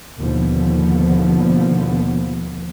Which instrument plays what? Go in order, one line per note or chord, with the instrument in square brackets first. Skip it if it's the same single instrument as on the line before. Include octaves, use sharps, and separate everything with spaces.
[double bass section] D#2 B2 D3 F3 B3